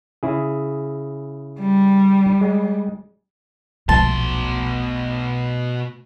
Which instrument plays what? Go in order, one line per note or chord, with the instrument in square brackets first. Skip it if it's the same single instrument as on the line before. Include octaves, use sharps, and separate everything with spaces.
[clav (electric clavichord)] C#3 E4 G#4
[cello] G3
[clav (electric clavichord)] G#3
[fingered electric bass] D#1 B1 F3 [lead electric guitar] B2 C6 [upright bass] A3 [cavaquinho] A5